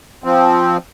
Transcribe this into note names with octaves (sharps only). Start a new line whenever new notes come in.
F3 C4